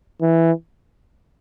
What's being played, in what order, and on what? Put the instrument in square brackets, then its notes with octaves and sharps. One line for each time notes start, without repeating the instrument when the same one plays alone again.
[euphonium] E3